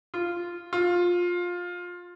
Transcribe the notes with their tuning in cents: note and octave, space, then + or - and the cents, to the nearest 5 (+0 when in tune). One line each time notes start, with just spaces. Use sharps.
F4 -5
F4 +15